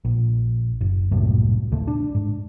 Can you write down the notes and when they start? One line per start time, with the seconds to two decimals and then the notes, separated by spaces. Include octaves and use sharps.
0.05 A#1
0.81 F#1
1.11 D#1 C2 F#2 A2
1.72 A1 D#2 C#3 A3
1.87 D4
2.15 G#2